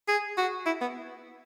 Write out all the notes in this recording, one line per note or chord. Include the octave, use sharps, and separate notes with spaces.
G#4
F#4
E4
B3